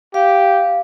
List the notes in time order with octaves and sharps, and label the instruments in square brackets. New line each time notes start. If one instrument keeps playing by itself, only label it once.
[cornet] G4 [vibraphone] F5